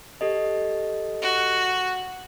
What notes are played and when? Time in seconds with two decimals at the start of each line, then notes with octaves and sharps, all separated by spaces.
0.21 G4 A4 D#5
1.22 F#4